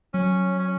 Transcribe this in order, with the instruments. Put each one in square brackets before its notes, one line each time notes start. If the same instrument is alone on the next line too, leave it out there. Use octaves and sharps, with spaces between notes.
[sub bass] F#3 [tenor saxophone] C#4
[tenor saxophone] C#4